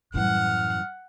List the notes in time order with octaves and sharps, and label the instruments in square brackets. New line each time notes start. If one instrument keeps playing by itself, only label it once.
[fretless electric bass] F#2 E3 [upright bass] A2 G3 [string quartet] F#5 [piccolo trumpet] F6